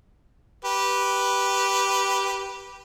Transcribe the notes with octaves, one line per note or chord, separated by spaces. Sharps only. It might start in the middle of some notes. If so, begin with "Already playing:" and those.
G4 B4